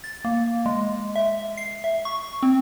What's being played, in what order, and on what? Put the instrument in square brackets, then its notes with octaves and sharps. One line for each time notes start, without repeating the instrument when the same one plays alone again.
[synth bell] A6
A#3
G#3
E5
C7
E5
C#6
C4